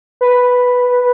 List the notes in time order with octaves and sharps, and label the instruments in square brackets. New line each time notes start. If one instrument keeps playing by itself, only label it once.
[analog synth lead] B4